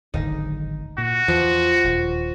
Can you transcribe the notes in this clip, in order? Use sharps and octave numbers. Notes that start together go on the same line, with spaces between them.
D1 G#1 D3 D#4
A#2 F#4
E2 E3 F3
D#1